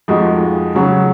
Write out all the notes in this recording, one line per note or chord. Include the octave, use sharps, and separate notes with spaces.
F2 F3 G#3 D#4 F#4
C#3 F#3 C#4 F#4